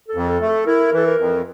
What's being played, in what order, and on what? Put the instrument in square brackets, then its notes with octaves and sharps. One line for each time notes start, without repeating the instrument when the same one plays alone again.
[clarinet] A4
[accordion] F2
[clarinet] A4
[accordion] A3
[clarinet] A4
[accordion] E4 [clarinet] A#4
[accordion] E3 [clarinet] A4
[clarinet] A#4
[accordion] F2